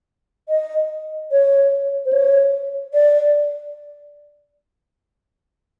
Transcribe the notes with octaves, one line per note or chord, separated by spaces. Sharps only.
D#5
C#5
C5
C#5
D5